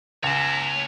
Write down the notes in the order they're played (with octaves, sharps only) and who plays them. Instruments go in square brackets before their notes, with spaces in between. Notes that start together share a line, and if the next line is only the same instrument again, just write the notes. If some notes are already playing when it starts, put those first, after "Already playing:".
[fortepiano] C#2 [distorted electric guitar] C#5 A5 [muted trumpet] A#5